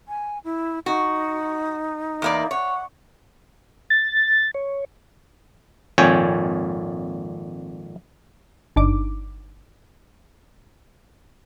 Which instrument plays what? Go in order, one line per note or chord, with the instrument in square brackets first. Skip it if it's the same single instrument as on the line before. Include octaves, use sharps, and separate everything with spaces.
[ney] G#5
E4
[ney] D#4 [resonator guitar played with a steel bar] F#4
[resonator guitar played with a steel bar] E2 A#3 D5
[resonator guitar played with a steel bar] C#5 [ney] F#5
[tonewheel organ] A6
C#5
[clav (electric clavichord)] G#1 F2 A#2 C#5 G5 G#5
[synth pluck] G1 D4 D#4 D6